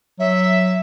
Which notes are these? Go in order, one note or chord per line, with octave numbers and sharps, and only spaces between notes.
F#3 E5